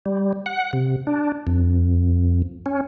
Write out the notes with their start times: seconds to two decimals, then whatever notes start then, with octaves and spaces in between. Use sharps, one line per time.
0.06 G3
0.46 F#5
0.73 C3
1.07 D4
1.47 F2
2.66 C#4